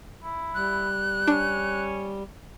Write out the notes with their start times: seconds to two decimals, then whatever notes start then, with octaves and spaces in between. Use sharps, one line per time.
0.23 E4
0.55 G3 F#6
1.27 C#4 D4